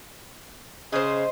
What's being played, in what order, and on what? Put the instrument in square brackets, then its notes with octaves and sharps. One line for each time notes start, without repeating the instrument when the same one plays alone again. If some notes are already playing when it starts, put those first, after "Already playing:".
[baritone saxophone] C#3 [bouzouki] C5 D#5